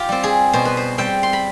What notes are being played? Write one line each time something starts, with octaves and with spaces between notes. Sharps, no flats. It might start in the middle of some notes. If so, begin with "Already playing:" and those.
Already playing: F4 G4
G3 C4
G#4
B2 C5
B4
C5
G3 C4 G5
C6
B5